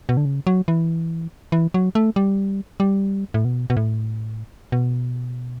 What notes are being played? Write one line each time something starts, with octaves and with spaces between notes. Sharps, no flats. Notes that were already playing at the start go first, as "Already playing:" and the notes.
B2
D3
C#3
F#3
E3
E3
F#3
A3
G3
G3
A2
B2
B2
A2
B2